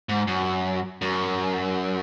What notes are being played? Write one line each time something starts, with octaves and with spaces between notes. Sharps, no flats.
G#2
F#2
F#2